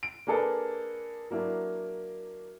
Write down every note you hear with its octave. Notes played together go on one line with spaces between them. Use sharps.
D7
A#3 D4 G#4 A4 B4
F#3 A#3 D4 E4